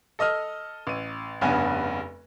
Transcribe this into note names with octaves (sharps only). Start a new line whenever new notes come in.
A4 D#5 D#6 F6
A1 D#7
F1 G2 C#3 B3 G#5